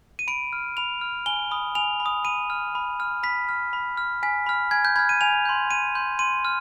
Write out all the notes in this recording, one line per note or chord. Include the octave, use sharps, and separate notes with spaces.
D#7
B5 D7
F6
B5 F7
F6
G#5 G7
B5 D#6
G#5 F7
B5
D#6
B5 D#7
F6
B5
F6
B5 B6
F6
B5
F6
G#5 B6
B5 F6
G#5 G#6
G6
B5 F6 G#6
D#7
G#5 F7
C6 G6
G#5 D#7
C6 G6
C6 D#7
F6